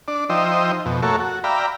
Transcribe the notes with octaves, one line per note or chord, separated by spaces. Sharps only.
D4 D5
F3 D#4 C5 D#5 E5 G5
F2 B2
A3 A#3 F#4 A4 C#5 E5
F#4
D5 E5 F5 G5 A#5 B5